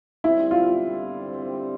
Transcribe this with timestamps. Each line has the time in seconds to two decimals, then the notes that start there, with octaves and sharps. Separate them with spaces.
0.24 G2 D3 G3 C4 E4
0.51 F4